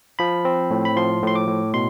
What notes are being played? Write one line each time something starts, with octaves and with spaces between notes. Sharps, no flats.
F3 B5
C4
A2
B5
F3 C6
A2
C6
D6
A2
B2 C6